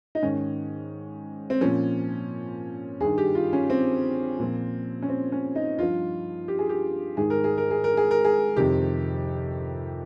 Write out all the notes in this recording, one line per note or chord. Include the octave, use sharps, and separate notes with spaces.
D#4
G#2 D#3 C#4
C4
A#2 F3 C#4
G2 D#3 G#4
G4
F4
C#4
C4
A#2 F3
C#4
C4
C#4
D#4
G2 F3 F4
G4
G#4
G4
G#2 D#3 G#4
A#4
G#4
A#4
G#4
A#4
G#4
A#4
G#4
F2 C3 D#3 G4